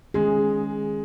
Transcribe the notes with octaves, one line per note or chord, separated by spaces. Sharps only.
D#3 G#3 C#4 G#4